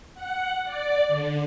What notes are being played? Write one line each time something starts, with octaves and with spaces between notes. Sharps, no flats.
F#5
D5
D3